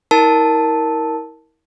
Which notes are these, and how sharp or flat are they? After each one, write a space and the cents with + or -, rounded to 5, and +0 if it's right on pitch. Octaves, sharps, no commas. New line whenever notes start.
E4 -40 A#4 +0 A5 +0